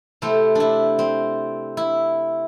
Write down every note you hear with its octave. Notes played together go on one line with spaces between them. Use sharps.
C3 A3 C4 E4
D4 E4
C4
E4